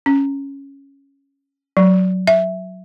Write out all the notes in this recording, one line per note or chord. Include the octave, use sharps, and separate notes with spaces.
C#4
F#3
E5